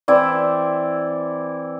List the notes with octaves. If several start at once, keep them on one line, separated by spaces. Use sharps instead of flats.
E3 C4 E4 D5